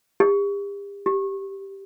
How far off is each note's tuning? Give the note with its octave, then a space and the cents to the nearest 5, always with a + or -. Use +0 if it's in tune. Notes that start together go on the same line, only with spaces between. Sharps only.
G4 +40
G4 -5